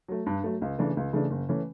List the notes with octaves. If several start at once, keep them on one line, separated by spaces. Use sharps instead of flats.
F#3 A3
G2
F#3 A3
C#2
C#3 E3 A3 D4
C#2
C#3 E3 A3 D4
F#1
E3 A3 C#4